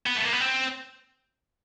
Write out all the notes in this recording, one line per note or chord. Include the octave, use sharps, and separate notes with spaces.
B3
A3
A#3
B3
C4